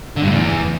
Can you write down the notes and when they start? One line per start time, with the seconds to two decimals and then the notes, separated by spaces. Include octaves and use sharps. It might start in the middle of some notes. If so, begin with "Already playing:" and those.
0.16 D3
0.22 G2
0.28 A2
0.34 E2